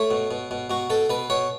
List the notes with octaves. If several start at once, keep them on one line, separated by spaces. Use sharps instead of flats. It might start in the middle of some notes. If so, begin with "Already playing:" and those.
Already playing: A3 C#5
B2
B2
B2
B2 F#4
B2 A4
B2 B4
B2 C#5